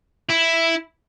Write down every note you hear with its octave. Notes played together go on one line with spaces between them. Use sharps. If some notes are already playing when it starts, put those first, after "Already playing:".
E4